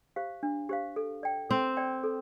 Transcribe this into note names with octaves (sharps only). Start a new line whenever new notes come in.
G4 C5 F5
D4
G4 C5 F5
A4
D5 G5
C4 A4
D5 G5
A4